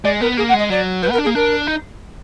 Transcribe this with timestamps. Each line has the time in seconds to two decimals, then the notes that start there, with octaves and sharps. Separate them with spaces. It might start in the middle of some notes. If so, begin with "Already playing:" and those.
0.04 G#3 D5
0.21 B3 A#4
0.37 A#3 G#4
0.49 F#5
0.54 G#3 D#5
0.70 F#3 D5
1.02 F3 B4
1.10 B3 A#4
1.18 D4
1.24 A#3 G#4
1.35 D4 A#4
1.67 D#4